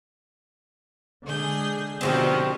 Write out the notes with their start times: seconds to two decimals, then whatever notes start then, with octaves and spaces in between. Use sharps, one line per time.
1.25 D3 G#3 G#4 G6
2.01 B2 D3 D#3 F3 C4 F#4 G4